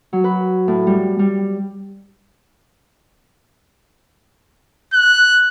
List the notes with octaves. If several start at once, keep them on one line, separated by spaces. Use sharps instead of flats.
F#3
B4
A2
G3
G3
F#6